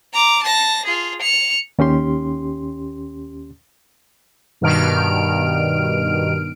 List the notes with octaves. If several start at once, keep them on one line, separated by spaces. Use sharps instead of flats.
A#5 D6
A5 A#6
F4 G#4
C#7 F7
D#2 C#4 G4 C6
G2 B2 D#3 F6 D7